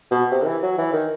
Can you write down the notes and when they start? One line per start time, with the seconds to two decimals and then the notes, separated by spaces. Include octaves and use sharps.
0.11 B2
0.32 C3
0.42 D#3
0.47 E3
0.63 F#3
0.78 E3
0.93 D#3